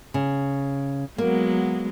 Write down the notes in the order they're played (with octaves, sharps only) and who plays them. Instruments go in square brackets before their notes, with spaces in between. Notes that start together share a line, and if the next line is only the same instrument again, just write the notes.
[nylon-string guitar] C#3
[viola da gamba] F#3 G#3 B3 [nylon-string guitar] A#3